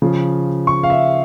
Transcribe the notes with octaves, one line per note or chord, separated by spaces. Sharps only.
C#3 F3
C#6
F5
E5